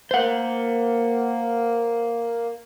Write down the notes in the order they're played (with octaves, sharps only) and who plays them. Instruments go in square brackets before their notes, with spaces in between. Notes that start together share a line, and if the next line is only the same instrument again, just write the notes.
[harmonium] A#3 [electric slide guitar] C5 F#5